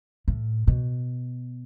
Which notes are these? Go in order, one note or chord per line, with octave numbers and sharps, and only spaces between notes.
A2
B2